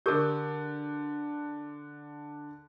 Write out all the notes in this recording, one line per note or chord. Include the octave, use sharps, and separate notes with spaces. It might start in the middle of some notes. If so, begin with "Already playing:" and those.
D3 G4 A4 A#4 D6 G6